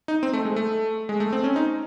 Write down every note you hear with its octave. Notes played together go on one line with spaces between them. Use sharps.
D#4
C4
A3
G#3
A3
G#3
A3
C4
C#4
D#4